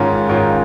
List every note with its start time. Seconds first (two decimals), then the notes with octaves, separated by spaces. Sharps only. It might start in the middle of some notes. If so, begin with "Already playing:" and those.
Already playing: G#2 D#3 C#4 F4
0.29 G#2 D#3 C#4 F4